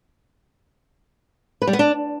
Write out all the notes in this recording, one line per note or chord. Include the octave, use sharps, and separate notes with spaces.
B4
G3
B3
D4